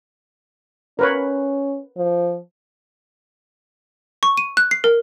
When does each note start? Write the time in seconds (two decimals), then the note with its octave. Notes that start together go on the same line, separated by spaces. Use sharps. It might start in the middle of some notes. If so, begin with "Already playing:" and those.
0.99 C#4 A#4 B4 C#5
1.97 F3
4.23 C#6
4.37 D#7
4.57 F#6
4.71 C7
4.84 A#4